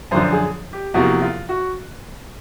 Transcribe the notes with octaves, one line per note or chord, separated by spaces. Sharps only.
F#2 D3 F3 C5
G#4
G4
E2 C3 F3 A#3 F#4
F4
F#4